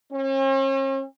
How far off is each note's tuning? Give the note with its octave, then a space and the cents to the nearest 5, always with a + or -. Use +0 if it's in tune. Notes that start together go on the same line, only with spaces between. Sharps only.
C#4 -45